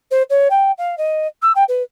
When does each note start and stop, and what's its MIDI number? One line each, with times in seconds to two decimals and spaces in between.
0.11 0.22 72
0.29 0.48 73
0.50 0.71 79
0.77 0.95 77
0.97 1.27 75
1.42 1.52 88
1.55 1.64 79
1.68 1.82 71